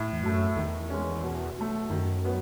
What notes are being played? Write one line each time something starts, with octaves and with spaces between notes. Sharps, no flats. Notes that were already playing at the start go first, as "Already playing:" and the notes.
Already playing: A2
E2
F#2 F#3 A3
E2 D#3
G#3 C#4
B2
F#3 A3
F#2 D#3
F#3 B3